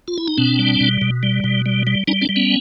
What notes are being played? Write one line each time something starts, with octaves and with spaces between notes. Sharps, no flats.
F4
E4
D#4
B2 C4 D4
G3
B2
B2
G3
B2
G3
G3
G3 C#4 D#4
C4 D4
G3
B3 C#4